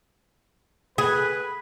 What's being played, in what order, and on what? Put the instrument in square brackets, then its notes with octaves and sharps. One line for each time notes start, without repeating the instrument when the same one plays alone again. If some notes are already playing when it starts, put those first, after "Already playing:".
[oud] G#4 [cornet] B4